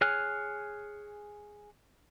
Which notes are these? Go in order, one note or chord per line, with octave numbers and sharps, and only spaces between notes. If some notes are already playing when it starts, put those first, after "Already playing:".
G#4 C#5 G#5 F6 F#6